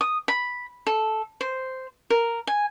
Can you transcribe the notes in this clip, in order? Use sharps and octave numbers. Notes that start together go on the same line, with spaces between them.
D#6
B5
A4
C5
A#4
G#5